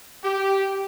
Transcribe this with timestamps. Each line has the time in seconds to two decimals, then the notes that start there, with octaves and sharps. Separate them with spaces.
0.24 G4